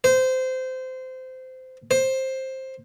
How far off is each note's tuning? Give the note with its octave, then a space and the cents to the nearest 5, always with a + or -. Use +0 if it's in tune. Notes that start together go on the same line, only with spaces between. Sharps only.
C5 -20
C5 +10